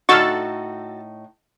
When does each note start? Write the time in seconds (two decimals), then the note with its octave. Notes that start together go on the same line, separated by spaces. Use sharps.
0.09 A2 D3 D#4 F#4 A4 C#6 F6 A6